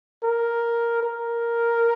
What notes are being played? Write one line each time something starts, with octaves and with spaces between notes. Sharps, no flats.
A#4
A#4